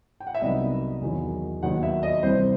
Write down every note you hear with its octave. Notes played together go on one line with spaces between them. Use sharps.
G5
F#5
E5
C2 C3 F#3 B3 D#4 D#5
E2 D#3 F#3
D#2 D#3 F#3 B3 D#4 F#5
E5
D#5
C2 C3 E3 G3 C4 C5